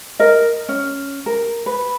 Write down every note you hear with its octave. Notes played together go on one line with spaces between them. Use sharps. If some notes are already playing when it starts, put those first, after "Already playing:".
A#4 D#5
C#4
A#4
B4